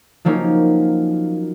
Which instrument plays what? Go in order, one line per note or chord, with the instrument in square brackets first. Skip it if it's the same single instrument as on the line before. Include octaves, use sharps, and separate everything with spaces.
[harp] F3 F#3 A#3 C#4 D#4